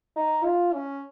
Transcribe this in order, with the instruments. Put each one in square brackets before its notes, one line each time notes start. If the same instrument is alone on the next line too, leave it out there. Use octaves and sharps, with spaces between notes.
[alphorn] D#4
F4
C#4